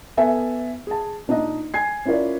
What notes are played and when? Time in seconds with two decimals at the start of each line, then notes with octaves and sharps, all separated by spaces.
0.17 B3 A4 B4 E5 G#5
0.87 G#4 A5
1.28 A#2 D4 D#4 D#5
1.74 G#5 G#6 C7
2.05 C#4 E4 F4 A#4 D5